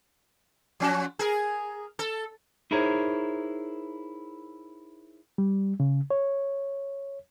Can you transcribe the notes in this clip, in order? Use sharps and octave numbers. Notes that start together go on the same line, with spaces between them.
F3 C#4 F#4
G#4 A#4
A4
D#4 E4 G#4 A#4 C5 C#5
G3
C#3
C#5